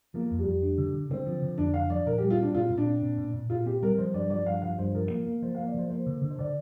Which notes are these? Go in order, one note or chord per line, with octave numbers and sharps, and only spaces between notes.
F3 A#3
F2
G3
F2
D4
D3
D3
D3 C4
F3
D3
F2 D4
D4 F5
F3 D5
A#2 A#4
G4
G3
F4
C4 D4
A#2 F4
A#2
D4
C4
A#2
A#2
A#2
A#2 F4
C4 G4
G3 A#4
F3 C5
G2 D5
F3 D5
G2 F5
F3 F5
G2 C5
F3 A#4
A#3
A#3
F3 C5
F5
A#3
D5
F3 C5
A#3 C5
D3
D3
C5
D3 D5